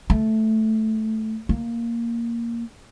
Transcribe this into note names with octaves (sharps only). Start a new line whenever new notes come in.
A3
A#3